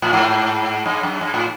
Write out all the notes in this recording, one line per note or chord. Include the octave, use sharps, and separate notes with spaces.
A2
G#2
G2
F#2
G2
A2